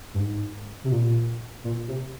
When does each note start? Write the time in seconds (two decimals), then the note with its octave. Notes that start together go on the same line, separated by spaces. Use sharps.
0.14 G2
0.20 G#2
0.84 C3
0.92 A#2
1.64 A#2
1.88 C3